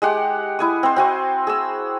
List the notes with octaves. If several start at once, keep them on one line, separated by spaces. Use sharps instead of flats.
G#3 G4 F#5
E4 G#5 D#6
C4 C5
C4 F#4 G#5
G#4 E6